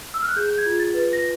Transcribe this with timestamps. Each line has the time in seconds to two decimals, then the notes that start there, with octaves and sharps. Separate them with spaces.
0.14 E6
0.22 F6
0.28 F#6
0.36 G#4 G6
0.50 G6
0.58 G#6
0.66 F4
0.79 A6
0.94 B4
1.13 A#6